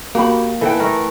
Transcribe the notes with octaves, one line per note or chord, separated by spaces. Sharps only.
A#3 F#4 G4 B5
E3 A4 B4 G5
A3 A#4